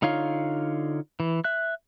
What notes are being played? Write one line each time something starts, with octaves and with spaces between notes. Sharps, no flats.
D3 D#4 F4 C#5 F5
E3
E5 F#6